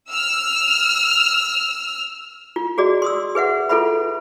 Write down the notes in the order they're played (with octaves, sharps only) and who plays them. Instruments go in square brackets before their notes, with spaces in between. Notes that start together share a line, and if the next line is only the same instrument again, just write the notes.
[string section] E6 F6
[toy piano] F4
F#4 G#4 D5 D#5
C6 D#6 E6
G#4 B4 E5 F#5
F4 A4 B4 E5 B5